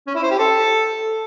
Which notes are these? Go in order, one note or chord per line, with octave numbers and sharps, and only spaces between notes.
C#4
E4
C5
G4
A4